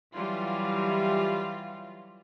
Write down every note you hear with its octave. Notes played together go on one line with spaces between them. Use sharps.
E3 F#3 G3 F4